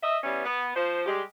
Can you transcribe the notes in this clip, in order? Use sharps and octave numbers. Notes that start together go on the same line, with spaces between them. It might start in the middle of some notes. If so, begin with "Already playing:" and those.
D#5 E5
E3 G3 B3 C#4
B3
F3 C5
G3 G#3 G4